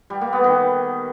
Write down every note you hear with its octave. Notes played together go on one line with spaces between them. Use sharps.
G3
A#3
B3
D#3